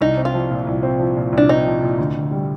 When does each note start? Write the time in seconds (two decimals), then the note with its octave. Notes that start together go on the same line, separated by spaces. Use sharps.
0.01 C2 D#4
0.17 C4
0.25 F4
0.34 F3
0.50 A#2
0.67 C2
0.83 C4
1.00 F3
1.17 A#2
1.32 C2
1.38 D4
1.49 C4 D#4
1.66 F3
1.82 A#2
1.98 D2
2.15 D2
2.31 G3